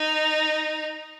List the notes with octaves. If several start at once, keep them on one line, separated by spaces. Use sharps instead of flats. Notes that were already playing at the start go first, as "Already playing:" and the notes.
Already playing: D#4